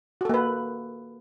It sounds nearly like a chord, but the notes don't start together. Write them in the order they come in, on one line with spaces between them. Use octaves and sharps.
F#4 A4 A#3 B4